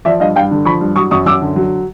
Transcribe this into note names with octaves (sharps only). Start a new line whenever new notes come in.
F3 D5 E5
G2 D#5 F5
G2 F5 G5
D3
F3 B5 C#6
G2
F#3 C#6 D#6
F#2 C#6 D#6
F#2 D6 E6
D3
F#3